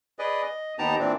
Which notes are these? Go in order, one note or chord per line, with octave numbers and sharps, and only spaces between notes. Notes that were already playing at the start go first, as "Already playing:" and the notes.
G#4 B4 D5 D#5
D#5
D#2 B3 D#4 G4 A5 A#5
A#2 E3 C4 D4